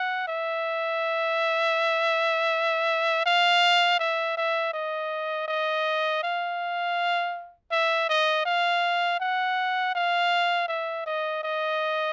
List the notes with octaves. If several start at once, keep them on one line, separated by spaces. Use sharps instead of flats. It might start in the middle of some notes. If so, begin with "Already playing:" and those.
Already playing: F#5
E5
F5
E5
E5
D#5
D#5
F5
E5
D#5
F5
F#5
F5
E5
D#5
D#5